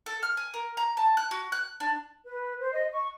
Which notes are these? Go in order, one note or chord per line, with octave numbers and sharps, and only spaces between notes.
A4
F6
G#5
A#4
A#5
A5
F#6
F#4
F#6
D4
B4
C5
D#5
C#6